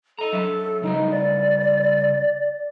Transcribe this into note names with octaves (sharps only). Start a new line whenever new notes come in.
A4 D#5 A#5
F#3 E5
C#3 G3 D#4 F#4
D5